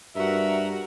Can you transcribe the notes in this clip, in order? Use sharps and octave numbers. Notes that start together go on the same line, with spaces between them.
G2 F#4 A#4 E5